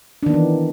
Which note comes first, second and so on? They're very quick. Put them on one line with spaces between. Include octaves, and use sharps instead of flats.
D4 D#3 B3 E3